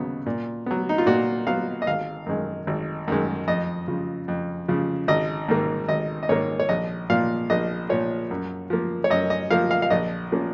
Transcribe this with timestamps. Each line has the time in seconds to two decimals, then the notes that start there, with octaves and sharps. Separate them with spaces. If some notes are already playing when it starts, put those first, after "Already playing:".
Already playing: D#2 C#3 F#3 B3
0.26 A#2
0.66 F#3 B3
0.89 D#4
0.98 F4
1.06 A#2 F#4
1.47 F#3 B3 F5
1.82 D#5
1.87 G#1 F5
2.26 F#2 D#3 G#3
2.67 G#1
3.08 F#2 D#3 G#3
3.48 F2 D#5
3.88 C#3 F3
4.28 F2
4.68 C#3 F3
5.08 G#1 D#5
5.48 G#2 D#3 A#3
5.88 G#1 D#5
6.23 D#5
6.29 G#2 D#3 A#3 C#5
6.60 C#5
6.69 A#1 D#5
7.10 A#2 F3 F5
7.50 A#1 D#5
7.89 A#2 F3 C#5
8.31 F#2
8.70 F3 A#3
9.04 C#5
9.10 F#2 D#5
9.30 D#5
9.51 F3 A#3 F5
9.71 F5
9.82 F5
9.90 A#1 D#5
10.32 F3 A#3 C#4